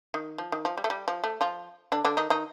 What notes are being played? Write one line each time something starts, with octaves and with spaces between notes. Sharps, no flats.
D#3
F3
D#3
F3
G3
A3
G3
F3
A3
F3 F4
D3 D4
D3 D4
D#3 D#4
D#3 D#4